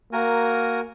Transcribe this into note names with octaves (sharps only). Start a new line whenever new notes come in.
A#3 F#4 A#4 G#5